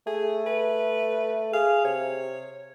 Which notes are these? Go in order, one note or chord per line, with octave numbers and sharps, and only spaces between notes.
A3 G#4
B4
G#4 F5
C3 C#5